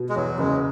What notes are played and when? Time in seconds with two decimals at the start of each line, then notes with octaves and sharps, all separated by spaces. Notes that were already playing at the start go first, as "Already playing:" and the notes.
Already playing: B2
0.09 G#3
0.16 E2 F#3
0.38 F#1 G#3